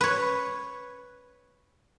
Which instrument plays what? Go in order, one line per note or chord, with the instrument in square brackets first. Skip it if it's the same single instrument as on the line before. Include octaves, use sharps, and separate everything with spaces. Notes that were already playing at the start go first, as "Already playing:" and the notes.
[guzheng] B4 C#5